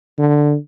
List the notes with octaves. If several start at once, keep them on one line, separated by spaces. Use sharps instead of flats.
D3